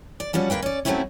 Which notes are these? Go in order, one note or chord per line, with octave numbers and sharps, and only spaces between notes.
D5
F3 G3 C#4 F#4
D2 G2 A#3 B4 G5
C#4 D5
F#3 A3 A#3 C4 C#4 E4